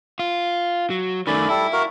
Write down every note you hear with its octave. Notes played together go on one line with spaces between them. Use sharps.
F4
F#3
D#3 A3 C#4 D5 B5
G3 E4 A4
F#4 A#4 F5